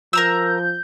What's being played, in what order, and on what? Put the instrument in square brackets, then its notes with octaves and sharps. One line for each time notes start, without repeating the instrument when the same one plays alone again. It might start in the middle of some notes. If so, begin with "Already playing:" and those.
[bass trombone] F3 [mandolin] A#4 A#5 E6 [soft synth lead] G6